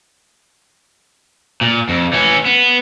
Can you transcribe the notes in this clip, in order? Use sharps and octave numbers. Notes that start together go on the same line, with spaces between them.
A#2
F2
E3 C#4
B3